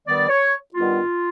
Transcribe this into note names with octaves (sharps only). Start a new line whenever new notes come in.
G2 D#3 G3 B3 D5
C#5
G2 D#3 G3 B3 F4